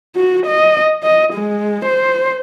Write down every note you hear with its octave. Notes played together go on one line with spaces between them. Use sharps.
F#4
D#5
D#5
G#3
C5